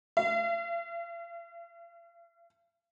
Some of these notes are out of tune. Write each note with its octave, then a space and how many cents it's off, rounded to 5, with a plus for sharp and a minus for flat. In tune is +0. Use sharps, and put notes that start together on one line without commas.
F5 -45